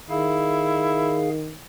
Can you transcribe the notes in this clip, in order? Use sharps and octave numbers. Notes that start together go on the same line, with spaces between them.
D#3 E4 G#4 F5